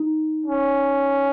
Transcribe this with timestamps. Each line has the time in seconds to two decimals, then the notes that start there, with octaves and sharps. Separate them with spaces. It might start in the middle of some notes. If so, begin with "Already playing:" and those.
Already playing: D#4
0.46 C#4